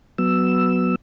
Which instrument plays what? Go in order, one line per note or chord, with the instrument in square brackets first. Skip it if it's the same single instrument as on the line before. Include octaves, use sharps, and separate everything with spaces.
[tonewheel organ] F#3 B3 E6